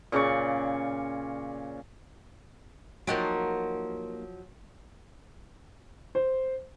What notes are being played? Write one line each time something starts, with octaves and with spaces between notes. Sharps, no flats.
A#2 C#3 D5 C#6
F3 F#3 A#3 D#4 G4
C5